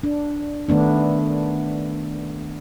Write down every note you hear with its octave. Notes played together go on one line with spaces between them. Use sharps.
D4
D#3 A3 B3 D4